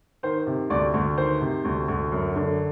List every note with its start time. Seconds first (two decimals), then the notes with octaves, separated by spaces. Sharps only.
0.23 D#3 C5
0.46 C3
0.70 D2 D5
0.94 D2
1.17 D#3 C5
1.41 C3
1.65 D2
1.88 D2
2.12 F#2
2.36 D3